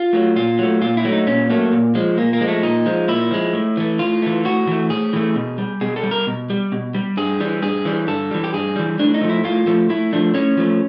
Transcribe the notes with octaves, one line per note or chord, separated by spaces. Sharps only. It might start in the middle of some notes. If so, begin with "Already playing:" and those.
Already playing: F4
F#3 A3
A#2 F4
F#3 A3
A#2 F4
E4
F#3 A3
D#4
A#2 C#4
F#3 A3 A#3
A#2
F3 G#3
A#2 A#3
A#3
F3 G#3
A3
A#2 D#4
F3 G#3
A#2 E4
F3 G#3
A2
E3 A3
A2 F4
E3 A3
A2 F#4
E3 A3
A2 G#4
E3 A3
B2
G3
B2 G#4
A4
G3
A#4
B2
G3
B2
G3
G2 G#4
E3 G3
G2 G#4
E3 G3
G2 A4
E3 G3
G4
G2 G#4
E3 G3
A2 D4
D#4
F3 A3
E4
A2 F4
F3 A3
A2 E4
F3 A3 D4
A2 C#4
F3 A3